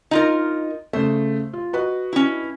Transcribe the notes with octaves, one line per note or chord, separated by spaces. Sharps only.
D#4 F4 A#4 D#5
C#3 A3 C5
F4
F#4 B4 D#5
C#4 E4